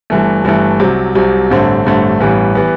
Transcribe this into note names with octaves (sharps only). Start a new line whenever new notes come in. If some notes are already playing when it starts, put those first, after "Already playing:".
G1 G2 E3 A3
G1 G2 E3 A3
C2 C3 F#3
C2 C3 F#3
A1 G2 D3 A3 C4
A1 G2 D3 A3 C4
A1 G2 E3 G3 B3
E3 G3 B3